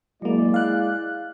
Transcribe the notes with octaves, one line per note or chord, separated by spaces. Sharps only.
F#3 G#3 A#3 E4 D5
F5 F#6